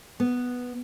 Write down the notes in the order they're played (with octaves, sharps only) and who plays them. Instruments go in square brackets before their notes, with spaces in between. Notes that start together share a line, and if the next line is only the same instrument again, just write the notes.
[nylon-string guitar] B3